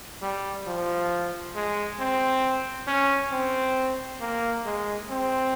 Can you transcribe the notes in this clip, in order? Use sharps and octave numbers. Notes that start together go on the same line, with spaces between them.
G3
F3
G#3
C4
C#4
C4
A#3
G#3
C4